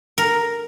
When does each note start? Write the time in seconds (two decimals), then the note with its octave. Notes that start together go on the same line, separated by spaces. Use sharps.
0.18 A#4